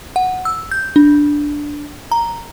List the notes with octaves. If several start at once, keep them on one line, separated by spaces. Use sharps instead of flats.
F#5
E6
G6
D4
A#5